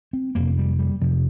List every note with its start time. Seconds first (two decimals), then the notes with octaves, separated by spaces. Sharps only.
0.13 C4
0.35 F2 C3 A#3
0.58 G3
0.79 G3
1.01 F2 C3 F3